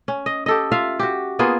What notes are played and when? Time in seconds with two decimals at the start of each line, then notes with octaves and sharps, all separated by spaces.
0.08 C#4
0.26 D#5
0.46 G4 A4 D#5
0.72 F4 E5 F5
0.99 F#4 G4
1.39 A#3 B3 F4 G#4